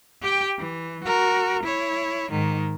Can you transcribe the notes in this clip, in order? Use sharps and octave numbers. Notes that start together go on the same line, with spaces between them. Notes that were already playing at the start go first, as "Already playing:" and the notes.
G4 G5
E3
F#4 A#4
E4 C#5
G#2 D#3